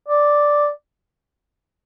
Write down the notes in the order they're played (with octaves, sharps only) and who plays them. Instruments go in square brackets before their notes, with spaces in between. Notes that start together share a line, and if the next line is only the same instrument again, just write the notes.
[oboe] D5